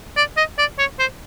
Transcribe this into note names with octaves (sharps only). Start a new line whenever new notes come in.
D5
D#5
D5
C#5
C5